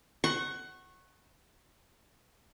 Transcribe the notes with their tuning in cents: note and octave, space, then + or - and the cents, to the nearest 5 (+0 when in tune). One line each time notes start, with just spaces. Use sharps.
F#5 +20 C#6 -20